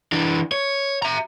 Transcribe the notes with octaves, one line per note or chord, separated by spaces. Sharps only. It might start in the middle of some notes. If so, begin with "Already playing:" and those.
E3 D4
C#5
E5 A#5